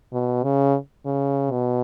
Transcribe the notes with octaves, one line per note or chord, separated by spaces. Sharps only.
B2
C#3
C#3
B2